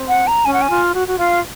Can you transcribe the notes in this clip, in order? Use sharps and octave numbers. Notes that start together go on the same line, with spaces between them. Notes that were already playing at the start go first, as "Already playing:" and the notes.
Already playing: C4
F#5
A#5
C#4 G#5
F#5
G#5
F4
F#4
F#4
F4 F5